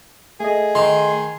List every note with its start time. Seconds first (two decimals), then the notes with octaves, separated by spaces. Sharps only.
0.40 A3 G#4 D#5
0.75 D#3 C6